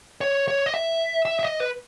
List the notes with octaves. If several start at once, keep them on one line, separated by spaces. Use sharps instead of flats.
C#5
C#5
D#5
E5
E5
E5
D#5
B4